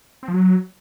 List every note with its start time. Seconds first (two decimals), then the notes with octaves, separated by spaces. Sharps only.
0.23 C4
0.28 F3
0.34 F#3